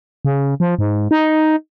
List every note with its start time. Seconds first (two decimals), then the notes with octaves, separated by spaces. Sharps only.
0.25 C#3
0.60 F3
0.79 G#2
1.11 D#4